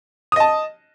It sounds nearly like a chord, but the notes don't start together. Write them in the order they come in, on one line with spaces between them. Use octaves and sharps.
D#6 D#5 A5